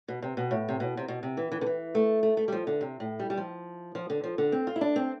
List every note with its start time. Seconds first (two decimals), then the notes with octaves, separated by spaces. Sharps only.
0.08 B2
0.22 C3
0.37 B2
0.51 A2
0.69 C3
0.80 B2
0.97 C3
1.08 B2
1.23 C3
1.37 E3
1.52 E3
1.61 D3
1.66 E3
1.95 A3
2.23 A3
2.37 A3
2.48 G3
2.52 F3
2.67 D3
2.81 C3
3.00 A2
3.20 G3
3.30 G3
3.37 F3
3.95 F3
4.10 D3
4.24 F3
4.38 D3
4.52 C4
4.67 F4
4.76 E4
4.81 D4
4.96 C4